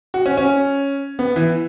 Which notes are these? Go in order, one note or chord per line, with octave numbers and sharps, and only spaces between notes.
F#4
C#4
C#4
B3
E3